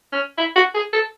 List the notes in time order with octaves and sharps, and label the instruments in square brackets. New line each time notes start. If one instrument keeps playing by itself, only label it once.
[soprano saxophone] C#4
E4
F#4
G#4
A4